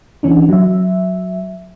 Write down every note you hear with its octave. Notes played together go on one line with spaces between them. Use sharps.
E3 C#4 D4
F#3 E5